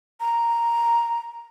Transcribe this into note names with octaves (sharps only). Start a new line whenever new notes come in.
A#5